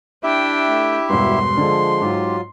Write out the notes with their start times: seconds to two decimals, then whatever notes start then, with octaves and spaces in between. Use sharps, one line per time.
0.23 D4 E4 G4 E5 G5
0.67 A3
1.09 E1 G2 F#4 C6
1.57 D3 F3 G#3 A4
2.01 G#2 F#3 F4 G4